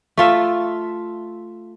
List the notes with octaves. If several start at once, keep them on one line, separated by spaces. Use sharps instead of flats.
A3 F4 E5